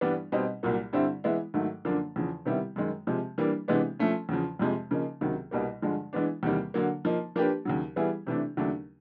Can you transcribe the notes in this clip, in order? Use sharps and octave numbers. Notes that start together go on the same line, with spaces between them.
G2 E3 G3 B3 D4
B2 G3 C4 D#4
C2 A#2 F#3 A#3
G2 D3 G3 C4 E4
E3 G#3 B3 E4
G#2 D#3 F#3 A3
F#2 D3 F3 A#3 D4
E2 C#3 F3
C3 D#3 G3 B3 E4
F#2 D#3 G#3
C3 F3 G#3
E3 G3 A#3 D4
C3 E3 G#3 B3 D4
F3 A3 C#4
E2 C#3 F3
F2 C3 F3 G#3
C#3 F3 A#3 D#4
C#2 C3 D#3 F#3
C2 B2 G3 A#3
G2 D3 F3 G#3
E3 G#3 B3 D4
E2 C3 D#3 G3 A#3
D3 F#3 A#3
F3 A#3 D#4
F3 A#3 D4 G4 B4
D#2 C#3 F#3
E3 G3 B3 E4 G#4
C3 E3 A3 D4
D#2 C#3 F#3 A3 D4